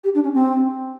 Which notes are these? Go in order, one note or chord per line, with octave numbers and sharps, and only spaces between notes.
G4
D4
C#4
C4